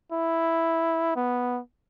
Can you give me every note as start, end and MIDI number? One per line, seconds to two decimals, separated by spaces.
0.12 1.11 64
1.16 1.60 59